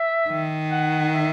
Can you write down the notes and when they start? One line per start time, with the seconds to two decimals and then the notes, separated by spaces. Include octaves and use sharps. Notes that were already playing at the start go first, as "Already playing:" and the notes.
Already playing: E5
0.29 D#3
0.71 F#5
1.14 E5